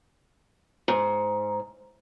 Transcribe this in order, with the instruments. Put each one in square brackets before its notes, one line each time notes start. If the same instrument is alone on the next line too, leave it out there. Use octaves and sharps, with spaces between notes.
[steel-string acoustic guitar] G#2